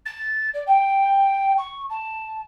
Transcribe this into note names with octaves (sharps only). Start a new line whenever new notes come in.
A6
D5
G5
C#6
A5